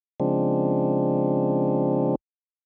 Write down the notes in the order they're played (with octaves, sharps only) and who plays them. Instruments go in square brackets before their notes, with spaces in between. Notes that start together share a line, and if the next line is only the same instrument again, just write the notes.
[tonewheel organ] C#3 F3 G#3 C4 D4